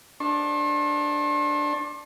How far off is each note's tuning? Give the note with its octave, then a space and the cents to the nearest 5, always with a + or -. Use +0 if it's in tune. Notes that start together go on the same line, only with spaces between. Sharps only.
D4 +0 C6 +45